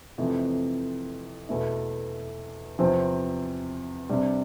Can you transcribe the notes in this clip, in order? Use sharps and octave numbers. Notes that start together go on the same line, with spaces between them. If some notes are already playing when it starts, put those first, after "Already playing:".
F2 C3 E3 A3
E2 B2 A3 E4
E2 C3 F3 C4
C3 G3 D4